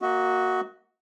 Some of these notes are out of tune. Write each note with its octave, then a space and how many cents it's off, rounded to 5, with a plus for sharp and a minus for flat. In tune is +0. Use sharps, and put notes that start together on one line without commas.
A#3 -10 F#4 +0 D#5 +40